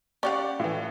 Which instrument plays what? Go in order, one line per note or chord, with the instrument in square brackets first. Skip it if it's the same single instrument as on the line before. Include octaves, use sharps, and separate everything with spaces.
[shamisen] C#4 G4 F5 [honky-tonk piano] D5 F#5
[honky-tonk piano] A2 E3